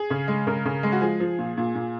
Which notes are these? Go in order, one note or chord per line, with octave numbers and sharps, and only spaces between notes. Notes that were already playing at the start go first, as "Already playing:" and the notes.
Already playing: G#4
C#3
G#3
C#3 A#4
C#3
G#3
F#4
F3 G#4
F3
A#2
A#2
A#2